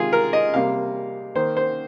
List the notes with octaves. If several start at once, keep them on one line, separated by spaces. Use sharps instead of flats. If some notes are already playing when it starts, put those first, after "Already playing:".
Already playing: C3 D#3 G#3 F4 G#4
A#4
D#5
C3 G3 A#3 F5
D#3 A#3 C5
C5